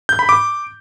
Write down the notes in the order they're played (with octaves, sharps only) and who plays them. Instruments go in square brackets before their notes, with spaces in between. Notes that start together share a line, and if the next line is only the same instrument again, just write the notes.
[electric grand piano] G6
B5
D6